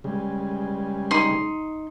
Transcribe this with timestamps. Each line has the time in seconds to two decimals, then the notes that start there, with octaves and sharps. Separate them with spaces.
0.04 C#3 G3 G#3
1.11 D#4 C6